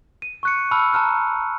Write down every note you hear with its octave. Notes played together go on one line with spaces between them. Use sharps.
D#7
C#6 F#6 C#7
A5 B5 E6 F6
A5 A#5 F6 F#6